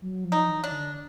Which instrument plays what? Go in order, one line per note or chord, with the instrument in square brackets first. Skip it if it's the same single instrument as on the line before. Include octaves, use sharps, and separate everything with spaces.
[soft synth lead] F#3
F3
[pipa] D#4
[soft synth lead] E3
[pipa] D4
[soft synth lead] D3